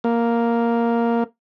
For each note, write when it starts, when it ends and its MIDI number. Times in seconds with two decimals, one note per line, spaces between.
0.04 1.24 58